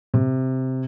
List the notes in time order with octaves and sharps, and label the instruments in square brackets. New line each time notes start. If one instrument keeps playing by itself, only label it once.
[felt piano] C3